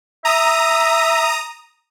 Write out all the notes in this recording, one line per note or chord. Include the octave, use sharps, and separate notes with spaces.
E5 A#5 D#6